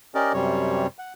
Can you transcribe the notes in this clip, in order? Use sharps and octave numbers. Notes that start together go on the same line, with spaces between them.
C#4 G4 A#4 D5 D#5
F#2 C3 G3 C#5
F#5